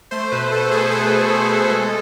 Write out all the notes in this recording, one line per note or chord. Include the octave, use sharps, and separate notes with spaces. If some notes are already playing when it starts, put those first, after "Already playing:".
A3 C5
B2 B4
B2 A4
A3 G#4
A3 A4
B2
B2
A3
G#3